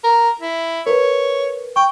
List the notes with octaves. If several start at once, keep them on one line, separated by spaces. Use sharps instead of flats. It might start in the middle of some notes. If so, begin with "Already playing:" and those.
A#4
E4
A#4 B4 C#5
G5 C#6